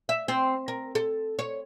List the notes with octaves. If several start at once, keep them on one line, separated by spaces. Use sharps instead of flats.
E5
C4
A#4
A4
C#5